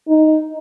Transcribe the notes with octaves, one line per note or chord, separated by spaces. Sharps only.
D#4